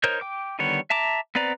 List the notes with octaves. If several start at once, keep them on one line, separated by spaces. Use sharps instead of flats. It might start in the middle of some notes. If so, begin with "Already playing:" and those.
D#4 A#4 C5 C#5 G6
G5 D6
D3 D#3 G3 B3 C#5
E5 A5 A#5 D6
B3 C4 B4 D5 A#5